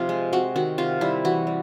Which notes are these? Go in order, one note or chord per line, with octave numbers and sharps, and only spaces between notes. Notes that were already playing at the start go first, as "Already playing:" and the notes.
Already playing: C3 F3 C4 D#4 F4
G#3
C4 F#4
D#3 F#4
C3 F4
G3 E4
E3 F#4
G3